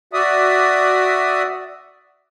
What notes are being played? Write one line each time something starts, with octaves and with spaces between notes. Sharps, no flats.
F#4 D5 E5 D#6